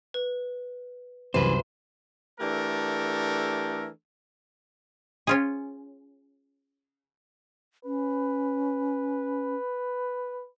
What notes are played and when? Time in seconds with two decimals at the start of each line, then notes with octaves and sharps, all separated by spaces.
0.14 B4
1.34 C2 F#2 C3 E3 B4 C5
2.40 E3 A3 D4 G4 A4 A#4
5.27 C#4 F4 G#4
7.85 C#4 B4